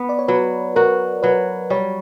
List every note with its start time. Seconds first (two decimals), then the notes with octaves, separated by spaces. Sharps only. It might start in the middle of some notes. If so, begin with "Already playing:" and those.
Already playing: B3
0.09 D5
0.19 C#5
0.28 F#3 B4
0.76 F#4 A#4
1.23 F#3 B4
1.70 G3 C#5